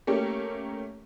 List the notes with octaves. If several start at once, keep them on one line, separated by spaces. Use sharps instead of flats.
A3 A#3 C#4 G4